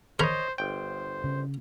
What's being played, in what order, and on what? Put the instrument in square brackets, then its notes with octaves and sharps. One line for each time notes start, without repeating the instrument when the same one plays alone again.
[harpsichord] A#4 A#5 B5 [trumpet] C5 [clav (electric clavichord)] C#5 D#5
[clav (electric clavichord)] G1 G5 [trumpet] C5
[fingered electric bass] C#3